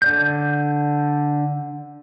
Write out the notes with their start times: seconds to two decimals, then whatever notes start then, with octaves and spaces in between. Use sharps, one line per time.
0.02 D3 D5 G6